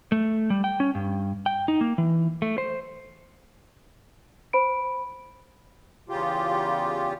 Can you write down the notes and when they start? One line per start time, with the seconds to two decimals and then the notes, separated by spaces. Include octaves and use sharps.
0.12 A3
0.50 G3
0.64 G5
0.80 C#4
0.95 G2
1.46 G5
1.68 D#4
1.81 A#3
1.98 E3
2.42 A3
2.58 C5
4.53 C5 B5 D7
6.09 E2 C#3 F4 G4